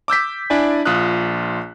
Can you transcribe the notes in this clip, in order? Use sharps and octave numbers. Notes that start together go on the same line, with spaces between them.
D6 E6 G6 B6
D4 E4 D5 G#5
A#1 F4 D#6 F6 F#6